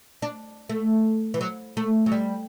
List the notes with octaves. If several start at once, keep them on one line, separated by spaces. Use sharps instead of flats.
D4
A3
E3
F#3
A3
F#3
G3